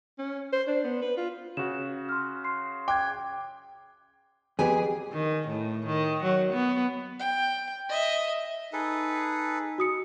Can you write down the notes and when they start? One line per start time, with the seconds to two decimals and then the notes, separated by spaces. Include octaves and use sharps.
0.19 C#4
0.53 C5
0.67 D4
0.84 B3
1.02 B4
1.17 F4
1.57 C#3 F#4 E7
2.09 C6 F6
2.44 C6 C7
2.88 G5 D6 F#6 G#6
4.59 F2 B3 G4 G#4 G#5
5.12 D#3
5.48 A2
5.87 D#3
6.23 F#3
6.53 B3
7.19 G5
7.89 D#5 E5
8.73 D#4 G#4 A4 B4
9.78 F#4 D#6 C#7